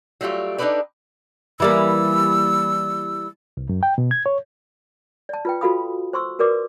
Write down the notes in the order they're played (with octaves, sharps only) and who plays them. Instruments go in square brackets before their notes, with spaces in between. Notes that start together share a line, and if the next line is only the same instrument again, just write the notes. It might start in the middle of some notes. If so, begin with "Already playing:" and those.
[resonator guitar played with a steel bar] F#3 G3 A3 F4 G4
D4 D#4 G4 A4 B4 D5
[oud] E3 G3 A#3 [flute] E6
[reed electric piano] C2
F#2
G5
B2
G#6
C#5
[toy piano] D5 A5
F4 B4 G5
F4 F#4 A4 F5 B5 D#6
C5 C6 C#6 E6
F#4 A#4 B4 D5 D6